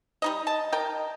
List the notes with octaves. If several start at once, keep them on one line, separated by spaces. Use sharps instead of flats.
G3 D#4 D#5
D#5 A5
A#4 G5